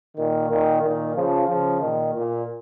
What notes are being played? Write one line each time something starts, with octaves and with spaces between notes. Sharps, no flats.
A#2 D#3
A#2 D#3
A#2 D#3
C#3 F3
C#3 F3
A#2 D#3
A#2